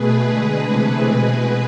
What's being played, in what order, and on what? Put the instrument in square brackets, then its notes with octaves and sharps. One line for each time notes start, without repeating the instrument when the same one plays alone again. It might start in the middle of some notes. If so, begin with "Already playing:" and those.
Already playing: [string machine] B2 A3 G#4 B4
D3 G#3
C3 E3 A3 G#4 B4
B2 G#3